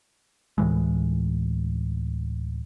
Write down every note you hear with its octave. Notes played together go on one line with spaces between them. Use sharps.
D2 A2 E3 G#3